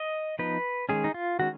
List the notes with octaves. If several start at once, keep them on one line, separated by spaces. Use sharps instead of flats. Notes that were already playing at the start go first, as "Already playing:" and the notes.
Already playing: D#5
F3 B3 D#4 B4
D#3 G#3 C#4 G#4
D#4
F4
D#3 G#3 C#4 F#4